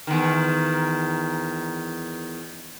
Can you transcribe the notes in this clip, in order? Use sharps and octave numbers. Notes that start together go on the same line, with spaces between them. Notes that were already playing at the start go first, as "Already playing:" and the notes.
E2 D#3